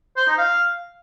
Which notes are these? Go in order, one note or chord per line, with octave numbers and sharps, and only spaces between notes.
C5
D#4
F5